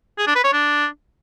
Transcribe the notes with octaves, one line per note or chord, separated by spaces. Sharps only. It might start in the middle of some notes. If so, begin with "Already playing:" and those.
G#4
D4
B4
C#5
D4